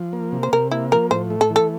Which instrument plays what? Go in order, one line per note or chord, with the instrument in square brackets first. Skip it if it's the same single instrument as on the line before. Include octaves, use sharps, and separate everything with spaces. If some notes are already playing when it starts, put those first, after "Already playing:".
Already playing: [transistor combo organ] F3
A#3
C3
[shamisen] C5
[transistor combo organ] C3 [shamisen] A#4
[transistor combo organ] A#3 [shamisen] E4
[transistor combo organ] F3 [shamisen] A#4
[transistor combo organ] A2 [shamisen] C5
[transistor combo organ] A3
[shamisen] A4
[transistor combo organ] E3
[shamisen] A4